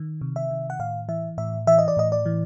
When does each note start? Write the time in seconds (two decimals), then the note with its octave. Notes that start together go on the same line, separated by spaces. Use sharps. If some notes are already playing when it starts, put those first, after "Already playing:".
Already playing: D#3
0.21 C3
0.36 E5
0.51 D#3
0.70 F#5
0.79 A2 F5
1.09 E3 E5
1.38 A2 E5
1.67 E3 E5
1.79 D#5
1.88 D5
1.97 A2 D#5
2.12 D5
2.26 E3